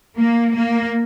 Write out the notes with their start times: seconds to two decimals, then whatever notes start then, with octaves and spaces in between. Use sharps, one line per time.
0.17 A#3
0.53 A#3